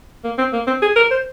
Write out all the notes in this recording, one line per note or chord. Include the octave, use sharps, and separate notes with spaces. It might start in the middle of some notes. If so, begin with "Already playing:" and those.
A#3
C4
A#3
C4
G#4
A#4
C5